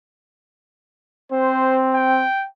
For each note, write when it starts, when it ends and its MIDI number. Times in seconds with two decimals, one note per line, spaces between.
1.32 2.26 60
1.32 1.79 72
1.94 2.47 79